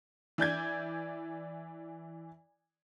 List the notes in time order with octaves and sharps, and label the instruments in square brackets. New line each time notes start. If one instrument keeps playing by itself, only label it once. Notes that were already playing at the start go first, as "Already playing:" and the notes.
[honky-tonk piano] E3 D5 G6 G#6